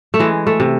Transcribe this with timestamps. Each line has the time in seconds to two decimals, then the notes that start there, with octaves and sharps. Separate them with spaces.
0.14 A3
0.19 E3 G#3
0.47 A3
0.60 C3